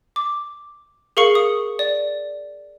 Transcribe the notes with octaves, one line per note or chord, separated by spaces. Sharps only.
D6
G#4 A#4 F5 C#6 C#7 F#7
D#6
D5